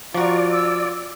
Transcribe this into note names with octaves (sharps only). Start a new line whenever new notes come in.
F3 F4 F#4 D5 A#5 C#6
E6